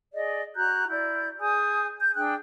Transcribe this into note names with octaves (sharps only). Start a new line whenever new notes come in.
G#4 D5 D#5
F#4 A#5 F#6 G6
E4 D5 G6
G#4 G#5 D#6 G6
G6
D4 G#4 G5 F#6